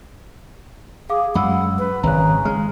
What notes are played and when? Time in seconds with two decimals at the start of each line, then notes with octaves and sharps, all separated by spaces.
1.10 G#4 F5 D6
1.35 F#2 G#3 F#5 B5 E6
1.78 B4
2.03 G#1 C#3 A#5 F#6
2.45 G#3 F6